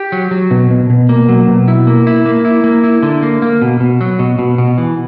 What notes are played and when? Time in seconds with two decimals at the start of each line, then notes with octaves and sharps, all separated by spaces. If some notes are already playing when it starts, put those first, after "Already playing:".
Already playing: G4
0.12 F#3
0.31 F#3
0.51 B2
0.71 B2
0.90 B2
1.09 A#3
1.29 F#3
1.48 B2
1.68 E4
1.87 A#3
2.07 E4
2.26 A#3
2.45 E4
2.64 A#3
2.84 E4
3.03 D3
3.23 A#3
3.42 A#3
3.62 B2
3.80 B2
4.01 F#3
4.19 B2
4.39 B2
4.58 B2
4.78 E3